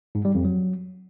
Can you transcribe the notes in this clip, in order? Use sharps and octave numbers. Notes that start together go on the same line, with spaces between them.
G#2
G3
F2
F#3